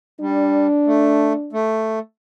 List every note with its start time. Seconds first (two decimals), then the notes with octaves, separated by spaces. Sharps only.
0.20 G3 D4
0.86 A3
1.53 A3